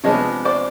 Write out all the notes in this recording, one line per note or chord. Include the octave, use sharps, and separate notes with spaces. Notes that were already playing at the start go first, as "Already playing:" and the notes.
C3 F3 G#3 B3 D4 C#5 D#5
C5 D5